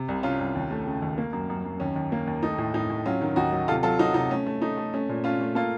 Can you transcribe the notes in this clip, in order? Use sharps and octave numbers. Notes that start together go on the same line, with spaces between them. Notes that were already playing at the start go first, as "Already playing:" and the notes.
Already playing: C3
C2
C3 C#4 F4
C2
D#2
A3
C#3
D#2
A#3
F#2
F#2
F#2
D#2 C#4
D#2
A#3
D#2
A3 D#4
A2
A2 D#4
A2
F#3 C#4 F4
D#3
D#2 D#4 F#4
F#3
C3 F4 A4
F#3 F4 A4
F#3 D#4 F#4
C3 D#4
A3 C#4
A3
A3 D#4
A3
A3 C#4
A#2
A3 C#4 F4
A3
A#3 F4 A4